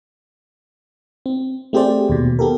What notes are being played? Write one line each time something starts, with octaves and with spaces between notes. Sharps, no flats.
C4
A3 C4 G4 G#4 C5 D5
D#2 B2
B3 G4 A4 A#4